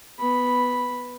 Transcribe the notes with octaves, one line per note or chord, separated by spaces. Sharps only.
B3 B5